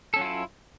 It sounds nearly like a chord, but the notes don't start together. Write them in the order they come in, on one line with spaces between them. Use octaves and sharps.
A4 C#4 F#3 F4 E4